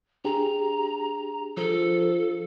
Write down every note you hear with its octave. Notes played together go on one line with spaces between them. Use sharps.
D4 G4 G#4 A#5
F3 A4